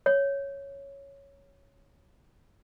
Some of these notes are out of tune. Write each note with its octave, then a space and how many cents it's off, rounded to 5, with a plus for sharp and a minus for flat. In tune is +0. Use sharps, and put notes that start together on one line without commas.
C#5 +0